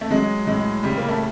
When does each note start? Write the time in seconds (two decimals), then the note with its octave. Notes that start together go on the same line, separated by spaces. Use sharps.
0.01 A3
0.11 F#3 G#3
0.47 A2 G#3
0.84 C#3 G3
0.97 A#3
1.08 A3